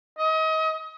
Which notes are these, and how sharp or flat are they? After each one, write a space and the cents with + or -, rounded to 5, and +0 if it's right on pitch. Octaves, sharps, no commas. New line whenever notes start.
D#5 +35